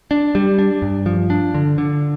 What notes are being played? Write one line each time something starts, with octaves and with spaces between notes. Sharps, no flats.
D4
G3
D4
G2
F3
D4
D3
D3